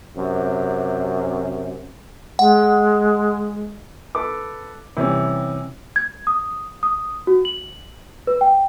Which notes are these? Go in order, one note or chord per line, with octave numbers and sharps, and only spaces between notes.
F#2 C3
G#3 F#5
A4 B4 D6
C3 E3 G3 C#4
G#6
D#6
D#6
F#4
F#7
B4
G5